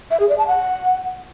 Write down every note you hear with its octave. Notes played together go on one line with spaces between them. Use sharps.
E5
G#4
D5
A5
F#5